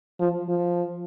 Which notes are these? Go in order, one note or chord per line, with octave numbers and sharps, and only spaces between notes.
F3
F3